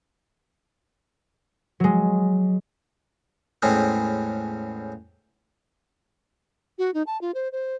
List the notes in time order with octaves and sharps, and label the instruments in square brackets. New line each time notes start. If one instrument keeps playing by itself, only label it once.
[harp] F#3 G#3
[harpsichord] E2 A2 G#3 C4 C#4
[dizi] F#4
D#4
A5
F4
C5
C5